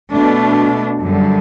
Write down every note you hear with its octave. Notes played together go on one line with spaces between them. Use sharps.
B2 A3 D4
F#2 D3 G3